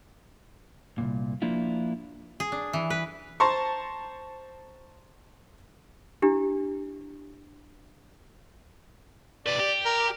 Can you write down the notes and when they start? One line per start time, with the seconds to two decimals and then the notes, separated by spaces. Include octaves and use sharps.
0.98 C2 F#2 A#2
1.42 F3 A#3 D4 E4 F4
2.40 G#4
2.52 D4
2.73 E3
2.90 B4
3.40 C5 A5 A#5 C6 C#6
6.22 D4 E4 G4
9.46 C3 B4 D5
9.60 G4
9.85 A#4